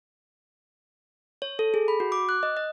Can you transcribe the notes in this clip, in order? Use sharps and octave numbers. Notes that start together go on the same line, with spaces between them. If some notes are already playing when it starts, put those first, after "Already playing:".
C#5
A4
G#4
B5
F#4
D6
F#6
D#5
D#5